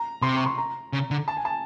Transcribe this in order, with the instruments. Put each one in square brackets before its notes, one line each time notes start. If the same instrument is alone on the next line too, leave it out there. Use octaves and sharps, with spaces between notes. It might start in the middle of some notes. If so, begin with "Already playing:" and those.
Already playing: [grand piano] A#5
[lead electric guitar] C3 [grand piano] C6
[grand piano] C#6
C6
A#5
[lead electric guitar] C#3
D3
[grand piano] A5
G#5
A5